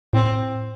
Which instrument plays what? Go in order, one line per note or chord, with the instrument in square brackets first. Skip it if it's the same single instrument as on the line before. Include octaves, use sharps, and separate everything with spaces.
[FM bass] A2 [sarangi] C4